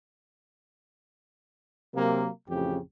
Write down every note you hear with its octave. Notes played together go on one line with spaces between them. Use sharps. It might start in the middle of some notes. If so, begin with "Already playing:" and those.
C3 F#3 A#3
A1 F2 C#3 G4